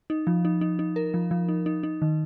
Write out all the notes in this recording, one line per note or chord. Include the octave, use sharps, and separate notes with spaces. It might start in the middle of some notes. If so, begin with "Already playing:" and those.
D#4
F3
D#4
D#4
D#4
A#4
F3
F3
D#4
D#4
D#4
D#3